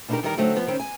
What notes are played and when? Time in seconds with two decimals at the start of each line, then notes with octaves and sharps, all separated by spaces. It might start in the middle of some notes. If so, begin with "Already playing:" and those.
0.09 B2 D4 D#4 F4 G4 A#4
0.23 D#3 E3 G3 D#4 E4 A#4
0.37 D3 F#3 A3 C4 D#4
0.56 F3 B3
0.67 D#3 C4 C#4
0.80 G#5